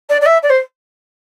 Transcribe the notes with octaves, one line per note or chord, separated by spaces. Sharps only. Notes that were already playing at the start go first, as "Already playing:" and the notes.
D5
D5
E5
D5
C5